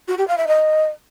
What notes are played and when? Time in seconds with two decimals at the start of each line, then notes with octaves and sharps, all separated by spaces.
0.08 F#4
0.17 G4
0.27 F5
0.37 E5
0.47 D#5